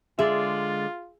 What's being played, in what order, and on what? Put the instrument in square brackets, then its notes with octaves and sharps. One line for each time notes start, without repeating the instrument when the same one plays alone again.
[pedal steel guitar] D3 G#3 D5 [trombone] F4 [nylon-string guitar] G#4 [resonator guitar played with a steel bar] E5